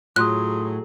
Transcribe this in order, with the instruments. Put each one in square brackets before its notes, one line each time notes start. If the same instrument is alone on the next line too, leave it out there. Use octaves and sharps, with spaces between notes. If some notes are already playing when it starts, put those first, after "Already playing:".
[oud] A2 [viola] F#3 G#4 [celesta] F4 C6 D#6 [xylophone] F#6